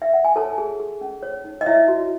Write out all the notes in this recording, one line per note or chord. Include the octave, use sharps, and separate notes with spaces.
E5
F#5
G#5
A4 C#5 A5
G#4
G#4
C#4
C#5
D#4
D#5
E4 C#5 E5
F#4